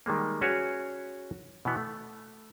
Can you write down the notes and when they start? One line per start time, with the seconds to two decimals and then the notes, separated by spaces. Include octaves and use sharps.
0.06 D#3 G3 G#3 A#3
0.41 C#4 F#4 G#4 B4 C#5 D5
1.65 B2 E3 B3
1.77 A3